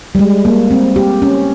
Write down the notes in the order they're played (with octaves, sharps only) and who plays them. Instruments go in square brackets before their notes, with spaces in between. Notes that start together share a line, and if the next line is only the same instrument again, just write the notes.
[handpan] G3
G#3
A#3
C4
G4
C#4